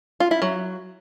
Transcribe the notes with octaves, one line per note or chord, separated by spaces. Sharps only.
F4
E4
F#3